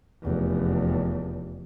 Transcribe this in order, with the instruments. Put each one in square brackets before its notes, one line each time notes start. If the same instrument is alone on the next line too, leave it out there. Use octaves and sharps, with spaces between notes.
[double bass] F1 E2